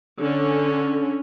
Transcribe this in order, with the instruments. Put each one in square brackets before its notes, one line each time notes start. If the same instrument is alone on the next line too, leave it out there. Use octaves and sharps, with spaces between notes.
[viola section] D3 C#4